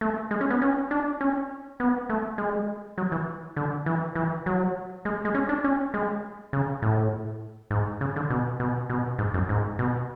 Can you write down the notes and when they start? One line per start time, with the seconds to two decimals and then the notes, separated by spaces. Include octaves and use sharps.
0.01 A3
0.31 G#3
0.41 C#4
0.50 B3
0.62 C#4
0.91 D4
1.21 C#4
1.80 B3
2.10 A3
2.38 G#3
2.98 F#3
3.12 E3
3.56 D3
3.86 E3
4.15 E3
4.46 F#3
5.05 G#3
5.25 G#3
5.35 C#4
5.49 D4
5.64 C#4
5.94 G#3
6.53 C#3
6.82 A2
7.71 G#2
8.01 C#3
8.16 D3
8.30 B2
8.60 B2
8.90 B2
9.18 G#2
9.34 F#2
9.49 G#2
9.79 B2